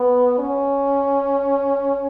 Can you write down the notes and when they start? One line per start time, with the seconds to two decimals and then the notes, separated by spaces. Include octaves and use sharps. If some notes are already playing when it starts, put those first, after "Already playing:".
Already playing: B3
0.39 C#4